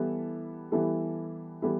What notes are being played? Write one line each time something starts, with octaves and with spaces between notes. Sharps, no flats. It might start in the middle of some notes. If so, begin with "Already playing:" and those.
Already playing: E3 G3 B3 E4 A4
E3 G3 B3 E4 A4
E3 G3 B3 E4 A4